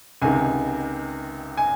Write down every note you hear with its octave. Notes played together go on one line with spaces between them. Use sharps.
C#2 C3 D#3 G#5
G#5